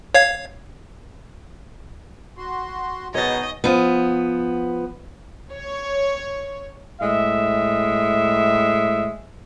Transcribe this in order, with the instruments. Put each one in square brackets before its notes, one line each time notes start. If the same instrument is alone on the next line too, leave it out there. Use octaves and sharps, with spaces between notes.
[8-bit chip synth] C#5 F5 G#6
[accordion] F#4 C6
[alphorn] B2 [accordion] D#4 G#4 [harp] C#5 A6 [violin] D#5
[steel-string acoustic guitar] F3 B3
[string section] C#5
[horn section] A2 G#3 E5